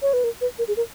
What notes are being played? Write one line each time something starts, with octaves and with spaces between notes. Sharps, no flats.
C#5
B4
A#4
B4
A#4
G#4
A#4